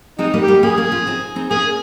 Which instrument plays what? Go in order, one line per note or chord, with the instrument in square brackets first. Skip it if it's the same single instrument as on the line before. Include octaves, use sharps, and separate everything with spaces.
[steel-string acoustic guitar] G#3 C4 [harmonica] D#4
[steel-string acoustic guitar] G3 A#3
[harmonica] G4
[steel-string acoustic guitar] G3 A#3
[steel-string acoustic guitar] A#3 C#4 [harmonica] G#4
[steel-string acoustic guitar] A#3 C#4
C#4 F4
C4 D#4
C4 D#4
[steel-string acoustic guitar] A#3 C#4 [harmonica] G#4